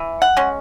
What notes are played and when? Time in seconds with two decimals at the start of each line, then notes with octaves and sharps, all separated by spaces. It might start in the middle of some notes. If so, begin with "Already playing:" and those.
Already playing: E3
0.22 F#5
0.37 G#3 C#4